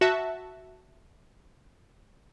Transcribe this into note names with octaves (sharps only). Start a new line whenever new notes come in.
F#4 E5 A5